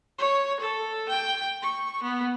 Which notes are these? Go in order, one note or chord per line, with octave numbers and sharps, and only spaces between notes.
C#5
A4
G5
C#6
B3